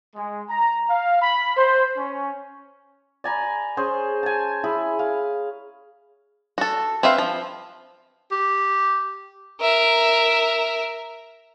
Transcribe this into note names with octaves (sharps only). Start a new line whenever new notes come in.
G#3
A#5
F5
B5
C5
C#4
D5 G#5 A#5 B5
C#4 G#4 C5
G#5 A5
E4 G#4 B5
F5
F#4 A4
C4 B4 E5 F5
F3
G4
A#4 E5